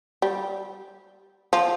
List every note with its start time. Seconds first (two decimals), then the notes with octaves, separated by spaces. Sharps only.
0.22 G3
1.53 F3